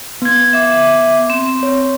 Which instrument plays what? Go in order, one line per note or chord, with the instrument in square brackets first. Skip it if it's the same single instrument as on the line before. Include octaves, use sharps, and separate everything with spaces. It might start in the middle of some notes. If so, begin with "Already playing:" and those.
[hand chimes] B3 G#6
[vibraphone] E5 D6
C4
[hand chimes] C#5